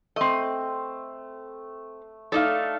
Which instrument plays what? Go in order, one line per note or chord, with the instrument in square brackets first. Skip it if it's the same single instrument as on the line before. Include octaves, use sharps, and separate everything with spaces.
[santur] A3 [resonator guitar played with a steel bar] C4 D#5
[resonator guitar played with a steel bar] A3 D#4 A4 [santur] D5 F5